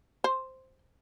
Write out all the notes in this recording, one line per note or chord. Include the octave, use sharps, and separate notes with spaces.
C5